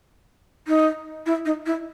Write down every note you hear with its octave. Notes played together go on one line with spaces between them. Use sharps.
D#4
E4
D#4
E4